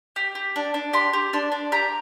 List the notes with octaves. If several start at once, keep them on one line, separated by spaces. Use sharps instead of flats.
G4
G4
D4
D4
G4 C6
G4
D4 C6
D4
G4 A#5